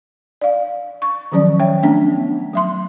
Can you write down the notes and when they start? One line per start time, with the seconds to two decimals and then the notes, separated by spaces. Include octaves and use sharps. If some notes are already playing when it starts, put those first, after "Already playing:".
0.42 D5 F5
1.02 C#6
1.32 D#3 F3 F#3 C#4 D5
1.60 C#5 E5 G5
1.83 A3 B3 C#4 D4
2.53 F#3 E5 C6